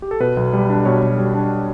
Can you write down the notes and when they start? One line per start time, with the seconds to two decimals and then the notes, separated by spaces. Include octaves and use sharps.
0.02 G4
0.11 A4
0.20 B2 B4
0.37 B1
0.53 G3
0.70 D4
0.85 B2 C#5
1.02 B1
1.18 G3
1.34 D4